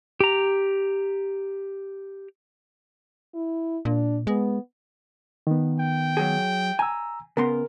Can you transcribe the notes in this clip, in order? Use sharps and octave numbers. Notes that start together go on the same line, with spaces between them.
G4 A#5
E4
A#2 D4
G#3 B3
D#3 B3
G5
F#3 G#4
G#5 A#5 E6
C#3 B3 A#4 C6